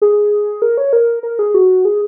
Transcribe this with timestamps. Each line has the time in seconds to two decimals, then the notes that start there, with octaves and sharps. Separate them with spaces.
0.02 G#4
0.62 A#4
0.77 C#5
0.93 A#4
1.23 A#4
1.39 G#4
1.54 F#4
1.85 G#4